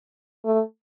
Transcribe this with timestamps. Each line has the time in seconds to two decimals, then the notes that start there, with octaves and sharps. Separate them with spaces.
0.45 A3